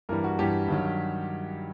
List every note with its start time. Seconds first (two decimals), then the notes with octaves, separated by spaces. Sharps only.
0.09 G2 E3 G3 A#4
0.24 F#4
0.39 G2 E3 G3 G4
0.68 G2 D#3 F#3